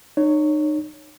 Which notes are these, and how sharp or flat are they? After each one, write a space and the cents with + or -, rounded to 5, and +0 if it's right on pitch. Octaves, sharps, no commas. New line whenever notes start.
D#4 -40 C#5 +0